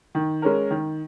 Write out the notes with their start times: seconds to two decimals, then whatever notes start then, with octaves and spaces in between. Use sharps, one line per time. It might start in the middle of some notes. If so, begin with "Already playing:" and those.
0.15 D#3
0.42 G#3 C#4 A#4
0.70 D#3